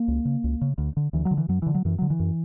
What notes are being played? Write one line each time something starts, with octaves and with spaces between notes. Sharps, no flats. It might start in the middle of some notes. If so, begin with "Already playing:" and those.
Already playing: A#3
C#2
C#3
C#2
C#3
D2
D3
D2 E3
F#3
D3
E3
F#2 F#3
D3 E3
F#3
F#2 E3
D3 F#3
E3
F#2